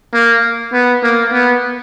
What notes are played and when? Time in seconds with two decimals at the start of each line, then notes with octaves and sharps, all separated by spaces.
0.14 A#3
0.73 B3
1.03 A#3
1.33 B3